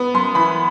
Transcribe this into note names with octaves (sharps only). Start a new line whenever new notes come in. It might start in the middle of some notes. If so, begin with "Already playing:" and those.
Already playing: B3
F#2 C6
E3 B5